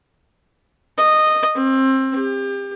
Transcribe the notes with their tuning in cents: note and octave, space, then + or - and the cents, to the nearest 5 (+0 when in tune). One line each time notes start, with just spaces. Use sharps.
D#5 -10
C4 +25
G4 +30